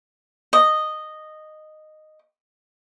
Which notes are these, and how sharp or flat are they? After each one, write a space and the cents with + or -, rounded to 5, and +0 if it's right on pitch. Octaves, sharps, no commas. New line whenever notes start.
D#5 -10